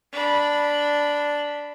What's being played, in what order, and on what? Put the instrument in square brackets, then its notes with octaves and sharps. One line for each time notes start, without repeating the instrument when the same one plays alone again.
[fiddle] D4 B5